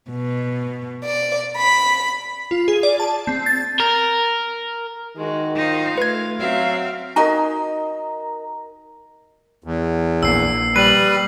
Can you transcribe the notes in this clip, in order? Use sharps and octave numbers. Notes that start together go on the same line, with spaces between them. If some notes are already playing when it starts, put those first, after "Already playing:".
B2
D5
B5
F4
G#4
D5
A5
C4
A6
A#4
D#3 G#3 F#4
D#4 F4 C5 F5
A3 B4 G#6
F#3 C4 E5 F5
D#4 F#4 A#4 D#5 G#5 A#5
E2
A#1 A#2 E6 C7
G3 B4 F#7